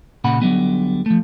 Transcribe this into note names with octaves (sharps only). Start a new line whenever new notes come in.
A#2 C#3 F#5 B5
D3 F#3 G3 B3
F3 A3